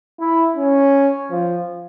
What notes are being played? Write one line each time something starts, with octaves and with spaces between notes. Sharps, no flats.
E4
C#4
F3